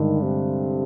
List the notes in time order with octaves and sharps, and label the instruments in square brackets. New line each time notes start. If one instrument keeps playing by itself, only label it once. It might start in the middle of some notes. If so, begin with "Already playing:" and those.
Already playing: [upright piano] G2 D3 G#3 [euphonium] D#3
[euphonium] C3